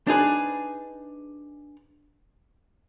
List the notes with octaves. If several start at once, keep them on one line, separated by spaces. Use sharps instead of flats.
D4 D#4 G#4 B4